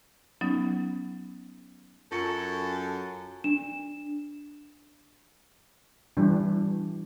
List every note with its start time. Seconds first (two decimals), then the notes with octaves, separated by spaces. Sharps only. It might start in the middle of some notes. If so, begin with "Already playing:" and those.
0.41 F#3 B3 C#4 D#4
2.12 F#2 F4 A4 C#6 C#7
3.44 D4 E7
6.17 E3 G3 D4